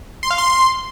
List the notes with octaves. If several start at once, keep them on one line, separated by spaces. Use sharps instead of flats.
C6
F5
C6